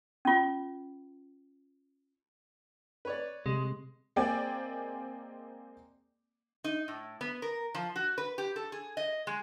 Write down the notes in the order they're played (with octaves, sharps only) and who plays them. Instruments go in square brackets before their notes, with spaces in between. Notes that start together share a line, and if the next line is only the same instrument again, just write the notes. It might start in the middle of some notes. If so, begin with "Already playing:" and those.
[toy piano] C#4 F4
[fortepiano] B4 C#5 D5
[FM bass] C3 [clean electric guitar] G#3
[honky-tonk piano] G#3 A#3 C4 D5 G5 G#5
[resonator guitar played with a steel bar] D#4
A2
B3
A#4
F3
F#4
B4
G4
A4
G#4
D#5
G#3